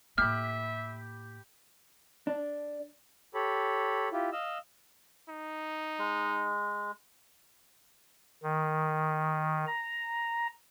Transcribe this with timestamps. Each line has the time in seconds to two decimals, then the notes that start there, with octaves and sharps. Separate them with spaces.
0.18 A2 A#3 G4 E5 B5 F6
2.27 D4
3.34 G4 A4 C#5 B5
4.12 E4 F4 G4
4.32 D#5 F5 E6
5.29 D#4
5.99 G#3
8.43 D#3
9.67 A#5